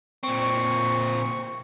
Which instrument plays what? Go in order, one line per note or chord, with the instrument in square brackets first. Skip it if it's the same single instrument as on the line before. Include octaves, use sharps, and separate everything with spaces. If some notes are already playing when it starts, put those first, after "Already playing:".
[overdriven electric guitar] A#2 C4 [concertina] C#6